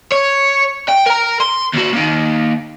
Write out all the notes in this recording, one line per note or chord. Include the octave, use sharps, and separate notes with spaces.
C#5
G5
A#4 A#5
C6
D#2 F#4
D#3 A#3